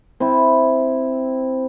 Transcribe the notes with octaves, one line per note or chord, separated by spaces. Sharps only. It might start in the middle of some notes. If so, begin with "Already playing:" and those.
C4 E4